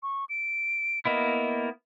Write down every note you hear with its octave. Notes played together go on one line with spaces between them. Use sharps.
C#6
D7
A#3 B3 E4 D#5